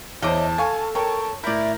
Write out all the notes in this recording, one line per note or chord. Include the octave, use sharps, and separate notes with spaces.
E2 C5 C#5 D#5 E5 A5 D6
A4 F5 G#5 C#6
A#4 C#5 G5 A5
A2 E4 A#4 D5 G6